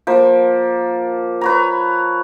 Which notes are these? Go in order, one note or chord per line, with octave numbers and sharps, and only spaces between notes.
F3 A#3
B4 C#5 A#5